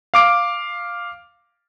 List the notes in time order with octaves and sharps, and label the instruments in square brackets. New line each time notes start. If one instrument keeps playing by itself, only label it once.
[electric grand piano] F5 D6 D7